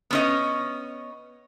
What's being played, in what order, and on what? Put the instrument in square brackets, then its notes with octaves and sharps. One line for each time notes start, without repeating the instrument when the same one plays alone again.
[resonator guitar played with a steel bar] B3 C#4 D#5